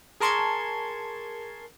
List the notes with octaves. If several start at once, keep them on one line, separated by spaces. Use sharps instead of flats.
G#4 A#4 A5 C6 C#6 G#6